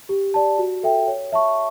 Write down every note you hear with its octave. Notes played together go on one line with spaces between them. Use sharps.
G4
D5 A5
F#4
A4 E5 G5
C#5
E5 A5 C#6